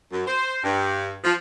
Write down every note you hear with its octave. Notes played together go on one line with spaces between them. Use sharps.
F#2
C5
G2
F3